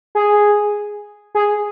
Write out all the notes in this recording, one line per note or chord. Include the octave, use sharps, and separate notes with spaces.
G#4
G#4